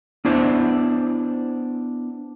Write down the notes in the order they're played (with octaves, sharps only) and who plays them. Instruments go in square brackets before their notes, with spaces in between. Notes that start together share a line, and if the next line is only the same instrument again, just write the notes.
[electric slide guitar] B3 D4 E4 C5 D5